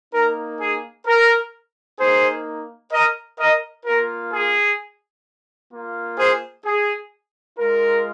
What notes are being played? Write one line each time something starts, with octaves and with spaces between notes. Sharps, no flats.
A#3 D#4 A#4
G#4
A#4
A#3 D#4 G#4 C5
A#4 D#5
A#4 D#5
A#3 F4 A#4
G#4
A#3 F4
G#4 C5
G#4
G#3 F4 A#4